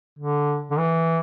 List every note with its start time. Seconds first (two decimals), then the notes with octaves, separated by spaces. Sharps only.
0.19 D3
0.71 D3
0.78 E3